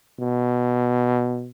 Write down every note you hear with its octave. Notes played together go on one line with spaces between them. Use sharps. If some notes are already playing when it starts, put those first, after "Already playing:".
B2